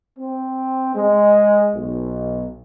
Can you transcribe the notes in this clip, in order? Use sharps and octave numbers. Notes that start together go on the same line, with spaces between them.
C4
G#3
B1